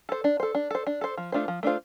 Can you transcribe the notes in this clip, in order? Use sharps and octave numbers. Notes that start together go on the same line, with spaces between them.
A4 C5
D4
A4 C5
D4
A4 C5
D4
A4 C5
F3
A3 D4 F4 C5
F3
A3 D4 F4 C5